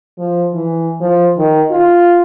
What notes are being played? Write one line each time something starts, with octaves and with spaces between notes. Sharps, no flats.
F3
E3
F3
D#3
F4